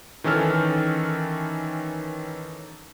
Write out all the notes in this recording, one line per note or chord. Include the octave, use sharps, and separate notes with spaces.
D#3 E3 C#4 A4 F6